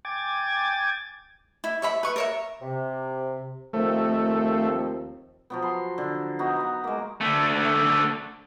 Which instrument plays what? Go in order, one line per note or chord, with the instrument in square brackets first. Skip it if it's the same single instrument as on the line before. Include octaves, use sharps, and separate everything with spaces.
[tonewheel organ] G5 G#5 D6 G#6 A6
[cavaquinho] E4
C#5 E5 B5
B4 C#6
A#4 C#5 E5
[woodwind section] C3
[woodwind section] D#2 F3 C4 [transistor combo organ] A3
[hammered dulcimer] F3 F#3 B3
B5 C6
D3
B3 D#4 F#4
B3 F#5
G#3 A#3
[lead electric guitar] D3 A3